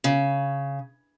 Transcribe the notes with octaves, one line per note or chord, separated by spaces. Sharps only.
C#3